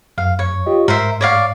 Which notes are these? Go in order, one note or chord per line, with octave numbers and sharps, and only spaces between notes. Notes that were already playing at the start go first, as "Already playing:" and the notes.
F#2 F5
C#5
F4 G4 D#5
G#2 A#4 C5 E5
C#5 D5 F5